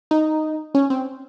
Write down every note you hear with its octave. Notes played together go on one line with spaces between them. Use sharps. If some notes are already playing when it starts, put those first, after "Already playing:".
D#4
C#4
C4